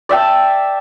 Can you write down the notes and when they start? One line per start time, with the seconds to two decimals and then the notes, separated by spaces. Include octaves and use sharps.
0.09 D5 E5 G5 A5